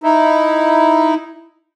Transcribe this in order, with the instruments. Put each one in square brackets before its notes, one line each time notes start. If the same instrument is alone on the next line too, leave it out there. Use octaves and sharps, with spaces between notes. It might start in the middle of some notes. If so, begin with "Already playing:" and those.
[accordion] D#4 E4